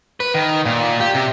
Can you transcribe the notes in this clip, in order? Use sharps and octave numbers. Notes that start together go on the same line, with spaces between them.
B4
D#3
A#2
G4
C3